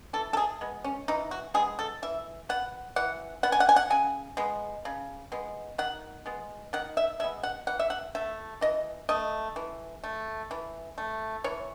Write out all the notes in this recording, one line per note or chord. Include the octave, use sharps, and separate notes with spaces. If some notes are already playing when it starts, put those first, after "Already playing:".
E3 A4
A4
G#4
G#3 B3
C#4
E3 D#4
F#4
G#3 B3 G#4
A4
E3 E5
B3 F#5
E3 F#5
B3 F#5
G#5
F#5
G#5
F#5
C#3 G#5
G#3 B3
C#3
G#3 B3
D#3 F#5
G#3 B3
D#3 F#5
E5
G#3 B3 E5
F#5
E3 F#5
E5
F#5
A3 E5
E3 D#5
A3 D#5
E3
A3
E3
A3
E3 C#5